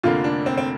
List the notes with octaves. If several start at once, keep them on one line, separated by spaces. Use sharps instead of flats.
F1 F2 D3 A#3 F4
D4
C4
C4